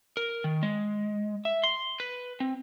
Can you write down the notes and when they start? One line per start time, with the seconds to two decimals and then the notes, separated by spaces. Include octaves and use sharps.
0.17 A#4
0.44 D#3
0.63 G#3
1.45 E5
1.64 C6
2.00 B4
2.40 C4